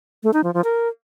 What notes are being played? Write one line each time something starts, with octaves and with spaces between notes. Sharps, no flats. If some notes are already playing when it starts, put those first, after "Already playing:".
A3
D#4
F3
F3
A#4